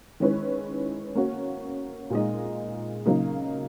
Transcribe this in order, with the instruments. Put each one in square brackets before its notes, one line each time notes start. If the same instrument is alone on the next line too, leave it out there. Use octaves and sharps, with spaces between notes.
[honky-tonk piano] D#3 G#3 C#4 E4 B4
A#3 C#4 F#4
A#2 G#3 D#4 G#4 D#5
C#3 F#3 A#3 D#4